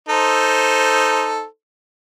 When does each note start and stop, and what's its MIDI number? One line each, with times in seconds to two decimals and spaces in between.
0.09 1.45 63
0.09 1.45 69
0.09 1.45 72